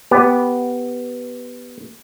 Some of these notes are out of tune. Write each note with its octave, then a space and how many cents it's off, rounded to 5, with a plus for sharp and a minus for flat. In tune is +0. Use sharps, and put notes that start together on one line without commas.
B3 +0 G4 +0